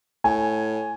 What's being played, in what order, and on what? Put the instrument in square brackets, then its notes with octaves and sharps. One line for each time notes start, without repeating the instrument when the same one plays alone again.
[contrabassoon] A2 [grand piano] G#5